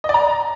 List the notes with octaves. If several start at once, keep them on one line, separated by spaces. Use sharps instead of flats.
D#5
D5
A#5